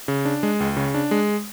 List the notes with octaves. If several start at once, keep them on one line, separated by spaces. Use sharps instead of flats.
C#3
D4
G#3
C#2
C#3
D4
G#3